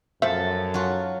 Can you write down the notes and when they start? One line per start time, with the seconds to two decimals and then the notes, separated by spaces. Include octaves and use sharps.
0.22 F#2 F3 A3 A4 E5
0.74 F#3 F4 F#4